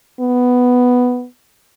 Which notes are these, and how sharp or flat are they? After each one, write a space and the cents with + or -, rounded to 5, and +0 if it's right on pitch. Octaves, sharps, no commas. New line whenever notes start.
B3 +5